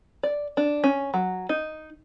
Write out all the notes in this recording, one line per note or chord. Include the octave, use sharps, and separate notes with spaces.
D5
D4
C#4
F#3
D#4